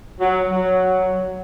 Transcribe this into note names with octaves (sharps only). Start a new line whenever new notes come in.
F#3
F#3